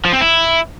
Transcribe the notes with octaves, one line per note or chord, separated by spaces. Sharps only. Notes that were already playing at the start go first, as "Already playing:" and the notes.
F3
C4
E4